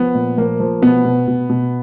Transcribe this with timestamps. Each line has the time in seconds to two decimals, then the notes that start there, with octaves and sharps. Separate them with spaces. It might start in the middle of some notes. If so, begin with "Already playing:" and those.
Already playing: F3 B3
0.15 A#2
0.37 F3 A#3
0.60 F3
0.82 B2 B3
1.05 B2
1.28 B2
1.50 B2